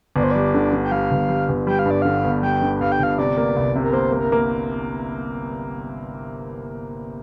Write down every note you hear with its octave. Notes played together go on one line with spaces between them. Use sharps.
G1 D5
C5
G3 D5
D3
D3
G5
G3 F5
G1
G3
G1
G3 G5
F5
G2 D5
D3 F5
G1
G3 G5
D3
G2 F5
G5
G1 F5
C3 D5
A#3
C2
C3
A#4
A#3 C5
A#3
A#4
A#3